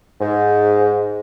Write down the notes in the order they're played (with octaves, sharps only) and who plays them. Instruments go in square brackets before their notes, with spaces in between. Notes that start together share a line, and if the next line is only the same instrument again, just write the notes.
[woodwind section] G#2